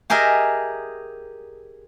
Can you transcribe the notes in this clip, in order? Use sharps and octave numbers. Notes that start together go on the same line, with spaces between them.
G4 G#4 A#4 D#5 E5